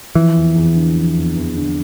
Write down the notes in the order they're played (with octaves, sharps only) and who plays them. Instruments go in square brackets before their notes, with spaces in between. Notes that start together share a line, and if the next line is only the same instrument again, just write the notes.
[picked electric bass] E3 [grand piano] F3
[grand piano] E2
E2
D3
F3
E2
E2
D3